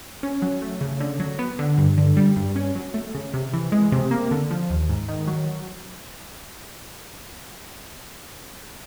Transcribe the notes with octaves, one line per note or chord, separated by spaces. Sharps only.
C#4
F#3
A3
C#3
D3
F#3
B3
D3
G2
D3
G3
G2
C#4
F#3
A3
C#3
C3
E3
G#3
C3
A#3
D3
F3
D#2
G#2
D#3
F#3